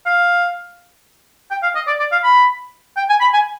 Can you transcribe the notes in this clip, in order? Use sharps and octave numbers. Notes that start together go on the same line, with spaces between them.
F5
G5
F5
D#5
D5
D5
F5
B5
G5
G#5
B5
G#5